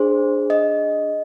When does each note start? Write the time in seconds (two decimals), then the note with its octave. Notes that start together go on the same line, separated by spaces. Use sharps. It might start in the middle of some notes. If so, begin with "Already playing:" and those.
Already playing: D4 G#4 C5
0.50 D#5